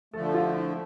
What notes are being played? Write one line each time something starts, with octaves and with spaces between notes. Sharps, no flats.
D3 F3 A3 A4
F4
E4